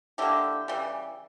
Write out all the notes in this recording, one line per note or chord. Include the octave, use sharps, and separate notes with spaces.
D3 A#3 E4 G4
C#3 E3 G3